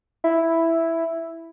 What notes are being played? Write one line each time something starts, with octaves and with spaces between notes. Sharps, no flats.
E4